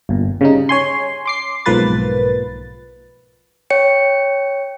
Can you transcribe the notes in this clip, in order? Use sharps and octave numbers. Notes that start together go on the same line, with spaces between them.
G1 A#2
C#3 G3 D#4
C#5 G#5 C6
C6 D6 C7
B1 G#2 F3 A#3 B4 A6
C#5 G5 C#7